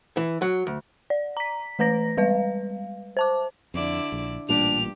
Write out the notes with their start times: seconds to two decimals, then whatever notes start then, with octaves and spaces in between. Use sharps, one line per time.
0.17 E3
0.42 F#3
0.67 D2
1.10 D5
1.37 A#5 B6
1.79 E3 A3 B4 A#5 A#6
2.17 G3 G#3 B4 F5
3.17 C5 A5 D6
3.74 F2 D3 E4 D5
4.12 A#1
4.49 A1 G2 A#2 G3 D4 G4 F7